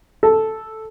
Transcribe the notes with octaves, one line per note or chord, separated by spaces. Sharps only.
A4